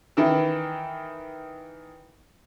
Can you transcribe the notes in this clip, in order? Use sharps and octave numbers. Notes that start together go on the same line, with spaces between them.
D#3 E3